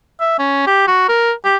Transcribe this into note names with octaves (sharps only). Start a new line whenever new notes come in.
E5
C#4
G4
F#4
A#4
G4